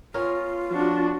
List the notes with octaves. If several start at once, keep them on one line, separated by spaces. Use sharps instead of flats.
B3 C#4 F4 A#4
F3 D4 F#4